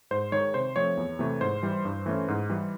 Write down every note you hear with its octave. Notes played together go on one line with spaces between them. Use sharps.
G#2 C5
D#3 G#3 C#5
C3 C5
F3 A3 C4 C#5
E2
C3 E3 A3
G#2 C5
E3 G3
G2
E3 A3 C#4
G#2
E3 G3